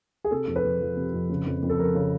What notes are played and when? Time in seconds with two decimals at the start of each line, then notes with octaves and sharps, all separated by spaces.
0.24 G#4
0.31 C3 A4
0.48 F2
0.56 B4
0.64 F2
0.81 F3
0.97 C3
1.14 F2
1.29 C#3
1.47 F2
1.62 F2
1.70 A4
1.79 F3 A#4
1.95 C#3